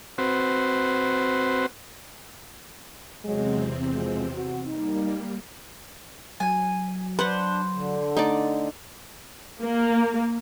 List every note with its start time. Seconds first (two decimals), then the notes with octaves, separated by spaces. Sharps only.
0.18 C4 F#4 B4 C5
3.24 E2 C3 F#3 G#3 C4
3.93 B2 F3 G#3
4.35 F#4
4.66 G3 A#3 D#4
6.40 F#3 G#5
7.19 D4 B4 C5 F#5
7.74 D3
8.17 A3 D#4 D5
9.63 A#3